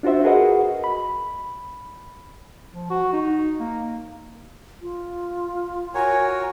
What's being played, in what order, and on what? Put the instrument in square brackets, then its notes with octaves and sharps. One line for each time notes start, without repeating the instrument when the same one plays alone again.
[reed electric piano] D4 F4 F#4 C5 E5
F#4 G#4 A#4 B4 D#5 F#5
B5
[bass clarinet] F3
F#4
D#4
A#3
[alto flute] F4
[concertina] F#4 A#4 C#5 [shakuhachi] G#5